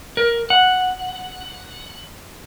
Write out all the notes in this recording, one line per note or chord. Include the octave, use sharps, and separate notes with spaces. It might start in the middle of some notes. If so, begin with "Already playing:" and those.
A#4
F#5